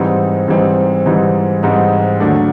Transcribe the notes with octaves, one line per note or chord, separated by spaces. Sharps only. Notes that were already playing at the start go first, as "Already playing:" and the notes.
Already playing: G#2 E3 G3 C4 D#4
G#2 E3 G3 C4 D#4
G#2 E3 G3 C4 D#4
G#2 E3 G3 C4 D#4
D#2 D3 F#3 A3 D4